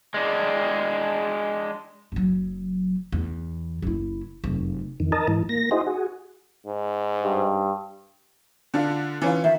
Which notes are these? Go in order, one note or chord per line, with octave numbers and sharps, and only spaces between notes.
G#3 D4
F#1 F#3
E2
F#1 E4
F1 F#2
F2 D#3
A#4 D#5 A5
G#2 E3
A#3 A#6
D#4 E4 F#4 G#4 C5 D#5
F#4 G#4
G#2
G2
D3 D4 F4
E3 C#4 F4
D#3 E5